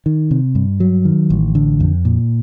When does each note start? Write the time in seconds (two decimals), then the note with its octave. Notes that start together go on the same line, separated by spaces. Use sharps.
0.06 D#3
0.31 C3
0.55 G2
0.80 F#3
1.05 D#3
1.30 A1
1.55 D3
1.80 F2
2.05 A#2